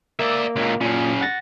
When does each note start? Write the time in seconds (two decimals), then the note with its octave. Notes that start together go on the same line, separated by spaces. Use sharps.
0.19 A#3 D5 E5
0.56 C#2 A#2
0.81 F#2 A#2 C#3
1.21 F#5 A6 A#6